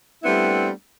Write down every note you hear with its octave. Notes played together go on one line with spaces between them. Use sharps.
G3 A3 B3 C4 D4 E4